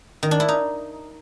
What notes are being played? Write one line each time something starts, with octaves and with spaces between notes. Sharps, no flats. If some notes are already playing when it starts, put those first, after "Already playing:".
D#3
D4
E4
D#4